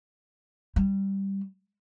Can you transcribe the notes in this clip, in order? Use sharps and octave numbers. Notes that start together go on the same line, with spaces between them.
G3